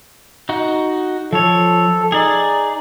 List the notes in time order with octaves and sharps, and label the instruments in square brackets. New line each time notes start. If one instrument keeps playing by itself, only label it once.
[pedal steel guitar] D#4 F#4
[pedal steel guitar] F3 C#5 [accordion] A4
[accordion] D#4 [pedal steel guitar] G#4 D5